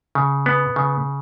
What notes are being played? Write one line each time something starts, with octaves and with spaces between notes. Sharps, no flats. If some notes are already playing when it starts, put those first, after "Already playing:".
C#3
B3
C#3